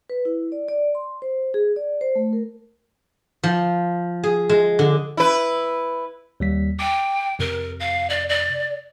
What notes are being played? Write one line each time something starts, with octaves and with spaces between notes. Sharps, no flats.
B4
E4
D5
D5
C6
C5
G#4
D5
C5
A3
A#4
F3
G#4
G#3
D3
E4 B4
D#2 G3 B6
G5 D6
F2 C3 A#4
F5
D5
D5